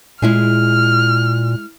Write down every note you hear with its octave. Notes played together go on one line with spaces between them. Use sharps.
A#2 G#3 E4 G#4 F6